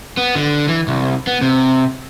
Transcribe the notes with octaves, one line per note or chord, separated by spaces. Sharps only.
B3
D3
E3
C2
B3
C3